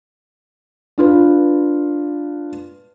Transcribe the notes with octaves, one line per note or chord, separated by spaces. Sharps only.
D4 F4 B4